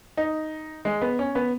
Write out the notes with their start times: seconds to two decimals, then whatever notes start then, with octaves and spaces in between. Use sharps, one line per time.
0.17 D#4
0.85 G#3
1.01 B3
1.19 C#4
1.35 B3